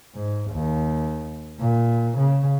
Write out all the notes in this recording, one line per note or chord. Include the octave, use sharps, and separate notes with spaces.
G#2
D#2
A#2
C#3